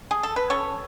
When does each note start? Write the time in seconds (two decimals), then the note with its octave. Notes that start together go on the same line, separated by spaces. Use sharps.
0.11 G#4
0.23 A4
0.36 B4
0.50 C#4 A4 C#5